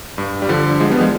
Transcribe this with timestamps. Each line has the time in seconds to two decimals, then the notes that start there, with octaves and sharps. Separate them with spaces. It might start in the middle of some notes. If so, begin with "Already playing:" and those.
0.18 G2
0.42 G3
0.49 D3 F3
0.80 F3 G#3
0.90 G3 B3
1.01 F3 G#3